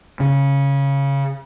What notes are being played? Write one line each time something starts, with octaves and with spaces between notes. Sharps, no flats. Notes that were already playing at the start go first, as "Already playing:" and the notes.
C#3